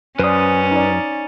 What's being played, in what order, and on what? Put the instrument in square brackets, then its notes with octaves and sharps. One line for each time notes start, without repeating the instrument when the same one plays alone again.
[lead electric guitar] F#2 [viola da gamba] C#4 [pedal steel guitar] B4 D#6 [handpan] C5 D5
[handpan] D#4 D5